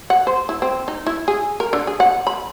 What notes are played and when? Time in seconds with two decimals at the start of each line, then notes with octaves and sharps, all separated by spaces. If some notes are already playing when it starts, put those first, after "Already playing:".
0.10 F#5
0.27 C5
0.49 E4
0.62 C4
0.88 D#4
1.07 E4
1.28 G#4
1.60 A#4
1.73 D3
1.87 G#4
2.00 F#5
2.27 B5